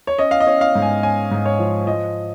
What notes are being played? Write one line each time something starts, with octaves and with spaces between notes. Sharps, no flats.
C#5
C#4 D#5
F5
D#5
C#4
F5
G#2
G#5
C#4 G#5
G#2
C#5
F3
F3 D#5